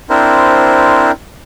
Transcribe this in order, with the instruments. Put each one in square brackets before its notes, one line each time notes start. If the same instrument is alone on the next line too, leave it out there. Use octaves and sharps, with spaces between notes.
[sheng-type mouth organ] C4 D4 E4 A#4 C5